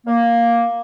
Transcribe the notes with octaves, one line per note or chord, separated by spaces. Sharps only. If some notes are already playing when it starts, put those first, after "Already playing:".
A#3